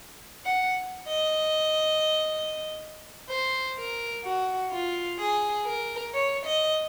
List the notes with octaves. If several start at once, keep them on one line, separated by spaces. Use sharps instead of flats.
F#5
D#5
C5
A#4
F#4
F4
G#4
A#4
C#5
D#5